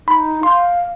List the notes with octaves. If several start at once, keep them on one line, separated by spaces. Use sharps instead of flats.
D#4 B5
F5 C6 G6